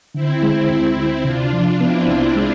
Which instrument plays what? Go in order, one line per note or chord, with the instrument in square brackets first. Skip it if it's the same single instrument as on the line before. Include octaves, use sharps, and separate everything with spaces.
[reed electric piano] D3 [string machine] C4 E4
[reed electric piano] G#3
D2
D2
[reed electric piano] C3 [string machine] D4 F4
[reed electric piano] F3
[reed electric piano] B3 [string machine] C4 E4
[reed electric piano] C2
G#3